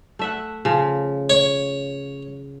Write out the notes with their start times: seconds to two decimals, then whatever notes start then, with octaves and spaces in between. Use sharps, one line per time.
0.19 A3 E5 F#5
0.65 C#3 F3
1.30 C#5